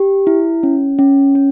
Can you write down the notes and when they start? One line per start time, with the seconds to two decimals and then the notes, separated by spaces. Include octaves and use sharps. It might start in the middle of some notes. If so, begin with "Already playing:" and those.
Already playing: G4
0.27 E4
0.63 C#4
0.99 C#4
1.35 C#4